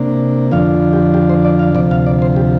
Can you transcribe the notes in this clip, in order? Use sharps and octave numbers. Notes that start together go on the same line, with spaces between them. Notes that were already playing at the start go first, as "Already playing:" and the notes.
Already playing: C3 A#3 D4
F2 D3 F3 D4 F5
G4
G4
C5
D5
F5
D2 C3 F3 D5
F5
D5
C5
G4